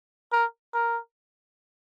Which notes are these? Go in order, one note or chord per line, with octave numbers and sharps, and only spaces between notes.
A#4
A#4